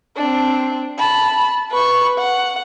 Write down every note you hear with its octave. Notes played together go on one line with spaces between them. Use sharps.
C4 D4
A5 B5
B4 C#6
F#5